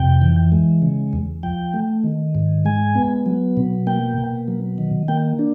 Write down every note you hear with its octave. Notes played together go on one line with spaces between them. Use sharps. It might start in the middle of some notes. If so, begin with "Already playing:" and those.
Already playing: F2 C3 G5
E3
G#3
C#3
E2
F3 G5
A3
D#3
G#2
G#3 G#5
B3
F#3
B2
A#3 G5
B2
F#3
D#3
A#3 G5
D4